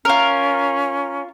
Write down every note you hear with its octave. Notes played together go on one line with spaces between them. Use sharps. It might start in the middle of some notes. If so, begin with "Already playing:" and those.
C#4 F4 A#4